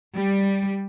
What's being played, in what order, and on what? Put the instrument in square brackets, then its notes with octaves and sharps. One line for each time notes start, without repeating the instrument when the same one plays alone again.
[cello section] G3